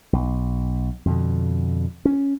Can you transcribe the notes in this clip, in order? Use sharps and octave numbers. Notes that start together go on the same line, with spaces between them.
B1
F2 B2 D3
C#4